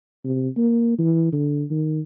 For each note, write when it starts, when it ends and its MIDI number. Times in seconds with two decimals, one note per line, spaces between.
0.24 0.49 48
0.57 0.94 58
0.99 1.28 52
1.33 1.64 50
1.71 2.00 51